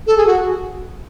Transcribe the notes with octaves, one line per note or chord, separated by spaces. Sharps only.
A4
G#4
F#4